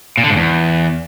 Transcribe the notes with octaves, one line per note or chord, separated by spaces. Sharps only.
A#2
D3
G#2
E2